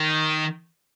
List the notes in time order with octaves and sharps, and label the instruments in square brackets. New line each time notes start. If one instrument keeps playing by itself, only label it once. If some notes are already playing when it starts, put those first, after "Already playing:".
Already playing: [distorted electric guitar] D#3